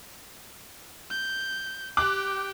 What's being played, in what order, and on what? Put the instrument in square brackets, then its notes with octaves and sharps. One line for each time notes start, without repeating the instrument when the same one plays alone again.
[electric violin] G6
[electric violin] G4 G5 [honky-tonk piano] D6 F#6